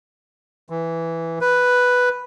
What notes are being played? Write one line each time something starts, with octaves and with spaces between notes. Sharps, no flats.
E3
B4